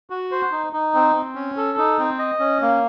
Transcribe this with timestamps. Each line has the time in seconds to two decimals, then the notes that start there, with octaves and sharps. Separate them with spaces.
0.10 F#4
0.31 C5
0.52 D#4
0.73 D#4
0.94 C4
1.15 C4
1.35 C#4
1.57 A4
1.78 D#4
1.99 C4
2.19 D#5
2.40 C#4
2.62 A#3